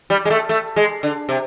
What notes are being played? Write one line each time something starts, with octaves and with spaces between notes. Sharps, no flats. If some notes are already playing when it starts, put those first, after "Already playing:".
G3
G#3
A3
A3
G#3
D3
C3